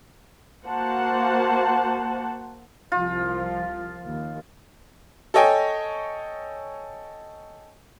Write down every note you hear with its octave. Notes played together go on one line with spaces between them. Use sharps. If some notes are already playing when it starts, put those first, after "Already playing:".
A#3 F#4 C5 F#5 A5
C2 F3 F4
D#2
A4 C#5 D#5 G5 G#5